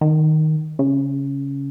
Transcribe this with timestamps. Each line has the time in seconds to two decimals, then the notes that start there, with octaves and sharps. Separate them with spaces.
0.01 D#3
0.79 C#3